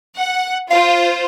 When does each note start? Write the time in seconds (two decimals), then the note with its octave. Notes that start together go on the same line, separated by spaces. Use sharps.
0.17 F#5
0.71 F4 C5 F5